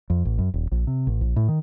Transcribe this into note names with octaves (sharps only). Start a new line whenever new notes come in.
F2
A1
F#2
D#1
A#1
C3
A1
A#1
A2
D#3